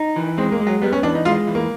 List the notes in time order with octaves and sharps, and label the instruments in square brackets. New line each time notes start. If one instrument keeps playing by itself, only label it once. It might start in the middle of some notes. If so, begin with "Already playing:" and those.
Already playing: [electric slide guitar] D#4
E3
[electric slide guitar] G#3 [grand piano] C4
[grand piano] A#3
[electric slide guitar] G#3
[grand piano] F#3
[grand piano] G3 [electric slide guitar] B3
[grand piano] C#4
[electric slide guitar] E3 [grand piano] D4
[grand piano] D#4
[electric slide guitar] G#3 [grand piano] F4
[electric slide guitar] E3
[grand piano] A#3